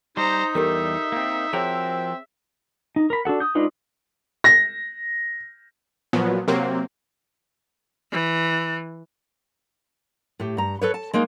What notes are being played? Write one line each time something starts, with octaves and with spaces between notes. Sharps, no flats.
G3 D#4 C5 A#5
E2 G3 G4 A4 A#4 E5
A#3 C4
F3 C4 F#4 G#4 A#4 C#5
D#4
A#4 B5
D4 F#4 A4 F#5
D#6 G6
G#3 D4 D#4 F4 B4
A#6
A#2 F3 F#3 B3
C3 F#3 A#3 C4
E3
A2 G4
G2 A#5
A4 B4 C#5
A5
G#3 A#3 D#4